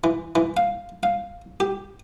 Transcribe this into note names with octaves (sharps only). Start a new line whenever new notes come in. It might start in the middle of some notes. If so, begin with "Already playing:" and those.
E3
E3
F5
F5
G4